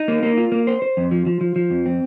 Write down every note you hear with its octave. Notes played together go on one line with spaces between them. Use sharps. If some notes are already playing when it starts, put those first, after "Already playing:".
Already playing: D#4
A#3
A#3
F4
A#3
C5
C5
F2
F3
F3
F3
F3
F2
C4